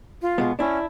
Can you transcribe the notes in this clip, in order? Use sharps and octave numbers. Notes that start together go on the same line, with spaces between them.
F4
B2 G#3 B3
C#4 D4 E4